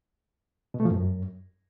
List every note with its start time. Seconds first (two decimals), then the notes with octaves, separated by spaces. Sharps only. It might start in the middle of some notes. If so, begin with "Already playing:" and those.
0.74 B2
0.80 A3
0.85 F3
0.91 F#2